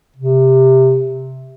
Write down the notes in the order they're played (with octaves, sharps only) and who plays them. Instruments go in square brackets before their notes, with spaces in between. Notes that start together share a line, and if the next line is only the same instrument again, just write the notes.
[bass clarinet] C3